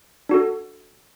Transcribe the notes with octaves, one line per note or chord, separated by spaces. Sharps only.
D4 F#4 A4